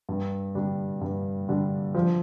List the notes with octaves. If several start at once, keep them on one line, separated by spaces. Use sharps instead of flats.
G2
D3 G3 D4
G2
D3 G3 D4
F3